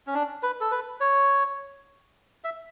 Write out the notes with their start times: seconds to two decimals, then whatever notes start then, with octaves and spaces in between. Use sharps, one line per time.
0.07 C#4
0.14 D4
0.43 B4
0.61 A4
0.71 B4
1.00 C#5
2.44 E5